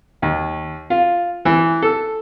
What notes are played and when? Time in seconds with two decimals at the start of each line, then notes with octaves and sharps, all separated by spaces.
0.22 D#2
0.90 F4
1.45 E3
1.82 A4